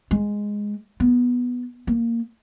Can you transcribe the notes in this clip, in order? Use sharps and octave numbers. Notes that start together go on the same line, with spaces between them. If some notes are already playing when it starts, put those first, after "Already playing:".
G#3
B3
A#3